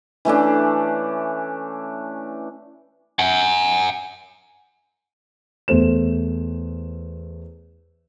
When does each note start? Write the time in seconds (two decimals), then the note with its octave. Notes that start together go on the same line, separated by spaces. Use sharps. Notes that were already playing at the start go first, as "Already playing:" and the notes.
0.25 E3 A3 C#4 D4
3.19 F#5 G#5
5.68 E2 A3 C5 E7